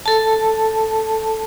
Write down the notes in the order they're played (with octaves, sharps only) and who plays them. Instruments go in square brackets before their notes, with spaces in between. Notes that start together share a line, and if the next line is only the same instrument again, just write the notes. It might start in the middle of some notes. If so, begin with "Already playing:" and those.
[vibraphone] A4 A5